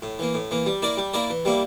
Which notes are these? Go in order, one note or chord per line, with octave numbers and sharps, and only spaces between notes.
A2
E3 A#3
A2
E3 A#3
G3
A#3 E4 A#4 D5
G3
A#3 E4 A#4 D5
E3
G3 A#3 E4